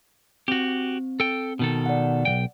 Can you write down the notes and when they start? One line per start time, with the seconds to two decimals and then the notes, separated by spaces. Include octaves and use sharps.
0.48 C4 F#4 G4
1.20 A4 G5
1.59 B2 D#3 A4
1.86 D5 F#5
2.25 B1 D#3 G5